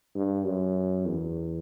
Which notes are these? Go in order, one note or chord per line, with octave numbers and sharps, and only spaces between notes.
G2
F#2
E2